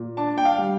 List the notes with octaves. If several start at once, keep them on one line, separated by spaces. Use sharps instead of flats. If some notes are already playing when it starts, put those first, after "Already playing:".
Already playing: A#2
D4 A5
G5
F5
G3